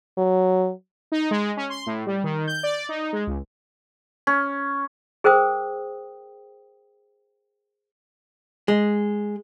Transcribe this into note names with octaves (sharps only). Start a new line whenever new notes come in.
F#3
D#4
G#3
C#4
C6
A2
G3
D#3
G6
D5
D#4
G#3
C#2
C#4
G#4 A#4 C5 G5 D#6
G#3